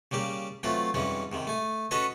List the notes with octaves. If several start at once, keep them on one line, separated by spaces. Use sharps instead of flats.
C#3 G3 A#3 G4
E3 F#3 A3 C4 F4
F2 G#2 E3 G3 C#4
G#2 C3 D#3
A3 G#5
C#4 F#4 A4 B4 C#5 D#5